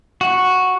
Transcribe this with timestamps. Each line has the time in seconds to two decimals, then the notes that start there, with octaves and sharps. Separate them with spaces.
0.21 F#4